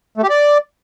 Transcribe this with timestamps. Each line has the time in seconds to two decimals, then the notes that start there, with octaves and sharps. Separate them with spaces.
0.17 A3
0.24 G4
0.30 D5